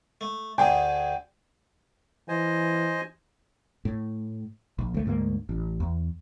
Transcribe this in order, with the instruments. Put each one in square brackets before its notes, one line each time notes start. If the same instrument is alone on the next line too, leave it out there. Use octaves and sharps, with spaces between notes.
[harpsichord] A3
[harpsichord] D2 D3 G#4 [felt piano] G5 G#5
[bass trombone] E3 [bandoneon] C5 D#5 G#5
[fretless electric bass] A2
A#1
D2 A3
D2 G#2 F#3 A#3
A1
E2